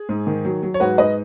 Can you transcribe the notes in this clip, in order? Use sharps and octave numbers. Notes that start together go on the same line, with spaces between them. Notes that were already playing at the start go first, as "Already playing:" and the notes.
Already playing: G#4
G#2
D#3
F#3
F#3
C#5
G#2 F#4 B4
G#2 B4 D#5